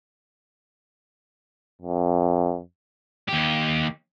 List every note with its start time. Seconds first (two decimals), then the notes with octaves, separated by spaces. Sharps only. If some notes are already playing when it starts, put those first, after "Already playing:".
1.82 F2
3.28 D#2 G4